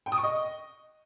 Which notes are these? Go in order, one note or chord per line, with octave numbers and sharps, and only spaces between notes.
G5
D#6
C#6
D#5